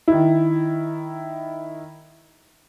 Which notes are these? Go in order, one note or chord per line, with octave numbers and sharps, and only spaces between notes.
D#3 E4